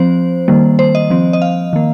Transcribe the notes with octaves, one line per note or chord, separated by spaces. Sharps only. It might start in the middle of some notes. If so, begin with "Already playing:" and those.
Already playing: F3 C4 C5
D#3 G3 A#3
C5
D#5
F3 C4
D#5
F5
D#3 A#3